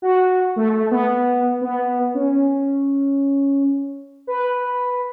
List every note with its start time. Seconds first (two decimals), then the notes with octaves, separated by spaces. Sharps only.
0.02 F#4
0.56 A3
0.74 A3
0.91 B3
1.61 B3
2.14 C#4
4.27 B4